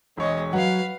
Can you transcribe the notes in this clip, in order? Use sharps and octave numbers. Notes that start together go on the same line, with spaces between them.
E1 G#3 C#5 D#5
F#3 B4 F5 F#5